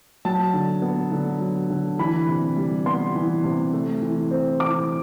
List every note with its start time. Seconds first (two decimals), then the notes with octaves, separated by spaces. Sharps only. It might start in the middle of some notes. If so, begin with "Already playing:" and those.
0.25 F#3 A5
0.54 D3
0.82 B3
1.12 D3
1.40 F#3
1.70 D3
1.99 E3 B5
2.28 C3
2.57 G3
2.86 B3 C6
3.15 E3
3.44 C3
3.73 A3
4.02 E3
4.31 C4
4.60 E3 D6